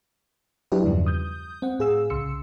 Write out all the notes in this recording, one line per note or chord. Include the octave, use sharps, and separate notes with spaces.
F#3 D4 E4 G4 B4
E2 G2 C#3 F3 G3
D#6 G6
C4 F#5
A2 G#4 F5 E6
C2 C#3 C6 E6 C#7